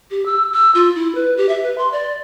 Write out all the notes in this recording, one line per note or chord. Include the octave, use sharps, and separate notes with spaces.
G4
E6
E6
F4
E4
B4
G4
E5
B4
C6
D5